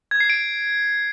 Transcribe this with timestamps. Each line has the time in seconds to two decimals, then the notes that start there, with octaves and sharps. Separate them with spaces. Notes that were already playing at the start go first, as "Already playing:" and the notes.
0.11 G#6
0.20 C7
0.30 D7